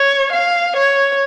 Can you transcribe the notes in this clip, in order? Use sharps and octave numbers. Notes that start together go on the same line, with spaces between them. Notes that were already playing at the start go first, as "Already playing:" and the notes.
Already playing: C#5
F5
C#5